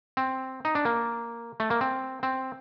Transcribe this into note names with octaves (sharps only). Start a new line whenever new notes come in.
C4
D#4
D4
A#3
A3
A#3
C4
C4